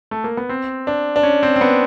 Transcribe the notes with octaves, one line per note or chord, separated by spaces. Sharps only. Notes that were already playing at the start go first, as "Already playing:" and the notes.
A3
A#3
B3
C4
D4
D4
C#4
C4
C4
B3